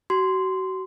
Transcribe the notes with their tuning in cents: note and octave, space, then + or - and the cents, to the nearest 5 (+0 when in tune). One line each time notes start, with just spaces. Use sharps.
F#4 +30 C6 -10